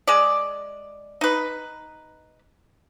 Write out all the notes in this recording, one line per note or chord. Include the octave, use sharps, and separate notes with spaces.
G#3 D5
D#4 B4